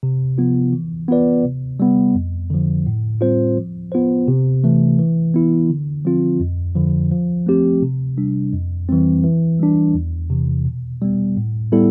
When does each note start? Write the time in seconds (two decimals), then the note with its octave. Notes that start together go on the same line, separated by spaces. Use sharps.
0.03 C3
0.38 F3 B3 F4
0.73 E3
1.08 B3 F4 B4 D5
1.45 C3
1.80 G3 B3
2.15 F2
2.50 D3 F3
2.87 A2
3.21 G3 C4 F4 C5
3.57 F3
3.92 B3 F4 C5
4.28 C3
4.64 E3 A3
4.99 E3
5.34 B3 E4
5.70 D3
6.05 F3 C4 F4
6.40 F2
6.75 D3 F3
7.11 F3
7.47 A3 C4 G4
7.82 C3
8.18 G3 D4
8.53 F2
8.89 E3 G3 C4
9.24 E3
9.59 G3 D4
9.94 E2
10.30 C3 E3
10.65 B2
11.02 G3 B3
11.37 A2
11.72 G3 B3 E4 A4